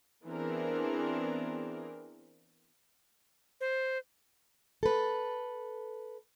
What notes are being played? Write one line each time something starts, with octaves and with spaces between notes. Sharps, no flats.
E3 B3 C4 D4 G#4 A#4
C5
A4 B4